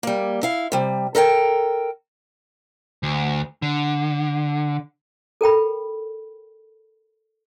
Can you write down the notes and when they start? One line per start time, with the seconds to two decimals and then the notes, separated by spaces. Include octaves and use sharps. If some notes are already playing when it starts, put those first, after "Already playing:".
0.03 G3 A#3
0.43 E4 F5
0.72 C3 G3
1.15 A4 A#4 F#5 G5
3.03 D2
3.62 D3
5.41 A4 A#4 G5 B5